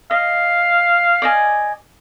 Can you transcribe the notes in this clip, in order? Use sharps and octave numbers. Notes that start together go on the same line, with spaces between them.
D#5 F5
D5 D#5 G#5